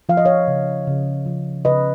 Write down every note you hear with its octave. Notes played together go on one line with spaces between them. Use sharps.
F3 F5
D#5
C#5 F5
C#3
C#3
F3
C#3 B4 D#5